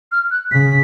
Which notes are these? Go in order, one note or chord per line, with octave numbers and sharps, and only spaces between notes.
F6
F#6
C#3 B6